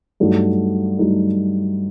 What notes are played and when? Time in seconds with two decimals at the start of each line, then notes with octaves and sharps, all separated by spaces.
0.20 G2 F#3 A3 D#4
0.99 G2 F#3 A3 D#4